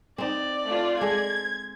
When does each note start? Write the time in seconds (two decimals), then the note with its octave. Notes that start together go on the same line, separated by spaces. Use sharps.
0.18 C4 D#4 D5
0.66 A3 F4
1.01 G#3 A4 G#6